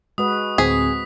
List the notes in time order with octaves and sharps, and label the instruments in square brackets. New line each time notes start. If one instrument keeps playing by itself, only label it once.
[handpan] G#3 F#4 B4 [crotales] D#6
[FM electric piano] D2 A2 C4 [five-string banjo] G#4 [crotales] B6